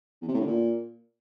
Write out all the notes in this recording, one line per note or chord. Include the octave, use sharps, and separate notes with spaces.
E2
C3
A2
D3
A#2